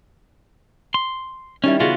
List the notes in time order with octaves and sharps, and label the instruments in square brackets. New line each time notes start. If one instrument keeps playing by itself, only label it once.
[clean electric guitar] C6
[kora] D#3 G3 E4 [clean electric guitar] C#4
[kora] C#3 E3 [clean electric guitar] B3 F4 F#4